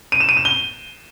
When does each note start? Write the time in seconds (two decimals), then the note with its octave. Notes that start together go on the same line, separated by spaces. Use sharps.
0.12 D#7
0.20 E7
0.29 D#7
0.37 E7
0.45 G7